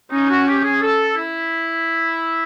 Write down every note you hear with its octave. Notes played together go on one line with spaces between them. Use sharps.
C#4 D#4
F#4
G4
G#4
A4
E4